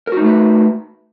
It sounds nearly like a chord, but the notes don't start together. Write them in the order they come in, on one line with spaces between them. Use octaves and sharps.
A#4 F#4 D#4 A3 B4